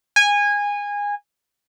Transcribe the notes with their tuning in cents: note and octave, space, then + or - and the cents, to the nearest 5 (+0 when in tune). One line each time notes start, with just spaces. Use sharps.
G#5 -20